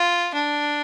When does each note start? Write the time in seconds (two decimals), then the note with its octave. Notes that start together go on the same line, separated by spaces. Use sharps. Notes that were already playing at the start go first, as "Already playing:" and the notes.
Already playing: F4
0.34 D4